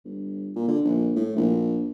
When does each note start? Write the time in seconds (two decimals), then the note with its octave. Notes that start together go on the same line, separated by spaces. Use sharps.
0.05 G1
0.56 A#2
0.68 D3
0.84 A#1
1.16 A2
1.36 A#1